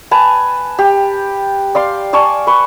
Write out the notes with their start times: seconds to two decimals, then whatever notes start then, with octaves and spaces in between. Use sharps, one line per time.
0.11 B4 G#5 A5
0.79 G4
1.75 D5 F5 C6
2.13 D5 G#5 A5 C#6
2.47 B4 C#6